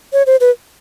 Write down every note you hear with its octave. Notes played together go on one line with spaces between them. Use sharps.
C#5
C5
B4